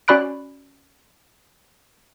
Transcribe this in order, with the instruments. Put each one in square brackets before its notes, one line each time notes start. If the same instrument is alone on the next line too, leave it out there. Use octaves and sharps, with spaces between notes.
[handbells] C#4 F#4 D5 B5 F#6 D7